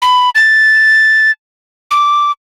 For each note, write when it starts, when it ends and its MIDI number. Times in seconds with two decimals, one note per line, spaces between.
0.02 0.30 83
0.35 1.31 93
1.91 2.31 86